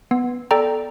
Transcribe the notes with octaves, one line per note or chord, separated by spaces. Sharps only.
B3
A4 D5 G5 A#5